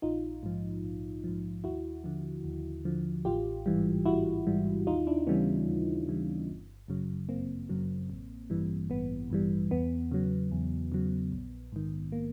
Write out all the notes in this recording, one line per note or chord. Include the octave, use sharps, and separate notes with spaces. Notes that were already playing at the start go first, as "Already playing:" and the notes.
A#1 D#4 F4
G#2 F3
A#1
G#2 F3
D#2 E4 F#4
D3 F3
D#2
D3 F3
A1 F4 G4
G#2 E3 G3
A1 E4 F#4
G#2 E3 G3
D#2 D#4 F4
D4 E4
C#3 E3 G3 B3 C#4
D#2
C#3 E3 G3
G1
F#2 C#3 F#3
G1 A#3 C4
F#2 C#3 F#3
A1
G2 E3 G3
A1 B3
G2 E3 G3
E2 B3
C#3 F#3
E2
C#3 F#3
A#1
G#2 D#3
A#3